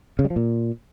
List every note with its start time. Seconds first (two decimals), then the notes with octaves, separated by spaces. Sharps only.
0.19 C#3
0.25 G3
0.30 F3
0.36 A#2